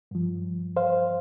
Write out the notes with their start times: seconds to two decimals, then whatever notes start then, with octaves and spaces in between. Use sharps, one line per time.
0.11 G2 F3
0.76 C5 F5